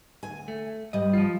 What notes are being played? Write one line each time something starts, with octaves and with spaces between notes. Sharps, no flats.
D2 G#5
A3
G2 G3 D#5
F3 F4